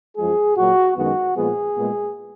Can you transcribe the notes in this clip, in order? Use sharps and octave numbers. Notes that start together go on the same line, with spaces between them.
F#2 F3 G#3 G#4
A#2 F#3 A#3 F#4
F#2 D#3 G#3 B3 F#4
A#2 F3 G#3 B3 G#4
A#2 G#3 B3